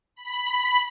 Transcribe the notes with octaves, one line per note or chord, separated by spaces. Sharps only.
B5